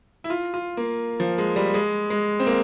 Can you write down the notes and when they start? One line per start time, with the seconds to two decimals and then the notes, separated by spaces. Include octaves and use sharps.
0.24 E4
0.30 F4
0.54 F4
0.77 A#3
1.20 F3
1.38 G#3
1.56 G3
1.74 G#3
2.10 G#3
2.40 C4
2.47 A#3